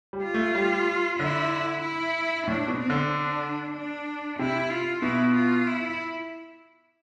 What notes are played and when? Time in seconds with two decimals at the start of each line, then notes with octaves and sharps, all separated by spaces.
0.13 G3
0.23 F4
0.34 A3
0.55 G3
1.19 D3 E4
1.82 E4
2.47 A2 D4
2.68 B2
2.79 C4
2.90 D3
3.10 D4
3.74 D4
4.39 C3 E4
4.71 F4
5.02 B2 E4
5.35 F4
5.67 E4